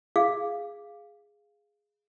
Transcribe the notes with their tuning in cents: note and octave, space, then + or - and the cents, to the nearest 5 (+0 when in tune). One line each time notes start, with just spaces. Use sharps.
G#4 +0 F5 -5